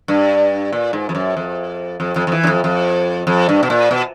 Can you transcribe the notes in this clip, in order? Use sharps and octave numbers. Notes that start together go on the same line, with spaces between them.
G2
A#2
G#2
F2
F#2
F2
F2
F2
F2
E3
F#2
F2
F2
F2
G2
B2
A#2
B2